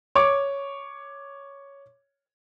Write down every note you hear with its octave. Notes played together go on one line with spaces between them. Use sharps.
C#5 D6